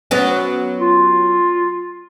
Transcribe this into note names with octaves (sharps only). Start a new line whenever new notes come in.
F#3 B3 C#4
F4